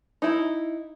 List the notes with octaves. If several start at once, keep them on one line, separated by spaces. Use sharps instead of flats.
D#4 E4